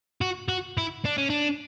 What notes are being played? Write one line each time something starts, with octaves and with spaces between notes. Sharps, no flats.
F#4
F#4
E4
D4
C#4
D4